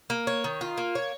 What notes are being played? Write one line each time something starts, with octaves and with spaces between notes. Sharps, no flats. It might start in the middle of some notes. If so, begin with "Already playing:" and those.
A#3
C#5
D#3
F4
A#3
C#5